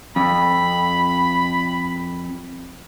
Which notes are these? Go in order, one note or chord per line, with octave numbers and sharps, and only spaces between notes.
F2 B5